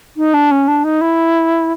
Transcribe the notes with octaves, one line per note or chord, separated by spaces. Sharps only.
D#4
D4
C#4
D4
D#4
E4